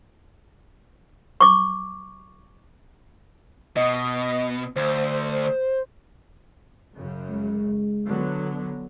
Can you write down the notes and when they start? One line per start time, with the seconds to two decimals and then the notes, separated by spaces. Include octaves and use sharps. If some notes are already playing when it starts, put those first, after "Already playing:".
1.41 C#6 D6
3.76 B2 D#5
4.76 D2 C5
6.95 F#2 C#3
7.30 G#3
8.05 D3 F#3 B3